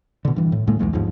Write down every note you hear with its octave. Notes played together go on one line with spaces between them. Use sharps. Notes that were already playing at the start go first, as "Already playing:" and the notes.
B2 D3
G2 E3
A2
D2 A2 G#3 A#3
B1 E2 G3 G#3
G1 D#2 G#2 F3